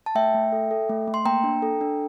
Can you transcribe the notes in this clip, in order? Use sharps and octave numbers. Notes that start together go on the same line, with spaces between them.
A5
A3 E5 G5
A3
A4
A4
A3
A3
C6
A#3 G5 A#5
D4
A4
D4